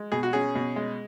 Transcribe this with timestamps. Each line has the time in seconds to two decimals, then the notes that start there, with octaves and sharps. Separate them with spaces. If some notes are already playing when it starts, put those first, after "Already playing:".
Already playing: G#3
0.12 B2 G#4
0.23 F#4
0.33 C#4 G#4
0.55 B2
0.76 G#3